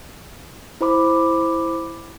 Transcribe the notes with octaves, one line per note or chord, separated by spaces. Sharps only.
E4 C5 B5 D6